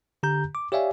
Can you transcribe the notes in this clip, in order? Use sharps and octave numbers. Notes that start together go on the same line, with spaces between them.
D3 G4 A#5 G6
D6
G4 C#5 D5 E5 F5 G#5